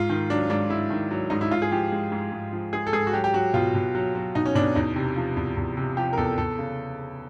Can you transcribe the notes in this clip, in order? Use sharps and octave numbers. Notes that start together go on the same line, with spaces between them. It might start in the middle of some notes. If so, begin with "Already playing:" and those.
Already playing: G#2 F4
D#3
F#3 D4
G#2 D4
G#2 E4
D#3
F#3
G#2 D#4
E4
G#2 F4
G#4
F3 G4
G#3
G#2
G#2
F3
G#3 G#4
A4
G#2 G#4
F#4
F#3 G4
G4
F#3 F#4
B2 F4
B2
F#3
F#3
B2 D#4
C#4
B2 D4
E2 D#4
C3
F3
E2
E2
C3
F3 G4
A#4
E2 A4
E2 A4
C#3